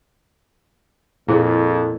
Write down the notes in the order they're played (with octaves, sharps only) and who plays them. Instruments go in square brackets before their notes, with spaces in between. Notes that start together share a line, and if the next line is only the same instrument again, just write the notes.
[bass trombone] F2 [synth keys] A#2 [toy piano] E4 G#4 C5